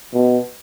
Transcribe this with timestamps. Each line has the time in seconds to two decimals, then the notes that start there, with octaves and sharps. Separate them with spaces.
0.14 B2